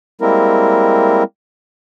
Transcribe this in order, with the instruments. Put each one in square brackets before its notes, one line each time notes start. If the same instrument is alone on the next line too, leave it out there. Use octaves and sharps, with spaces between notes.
[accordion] G3 G#3 A#3 C4 E4 A#4